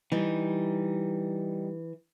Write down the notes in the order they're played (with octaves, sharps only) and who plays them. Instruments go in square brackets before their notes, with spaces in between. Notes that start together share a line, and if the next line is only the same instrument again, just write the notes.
[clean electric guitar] E3 [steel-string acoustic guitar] G3 D#4